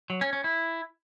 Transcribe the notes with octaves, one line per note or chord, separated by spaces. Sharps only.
F#3
C#4
C#4
E4